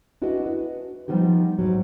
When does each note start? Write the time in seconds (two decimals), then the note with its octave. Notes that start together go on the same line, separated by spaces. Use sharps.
0.22 D4 E4 F#4 G#4 B4 D#5
0.46 B4
1.08 F3 G3 B3 D#4 G4
1.59 G#2 F#3